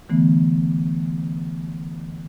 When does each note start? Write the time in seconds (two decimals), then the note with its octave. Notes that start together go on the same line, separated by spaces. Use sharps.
0.09 D3 E3 A3 B3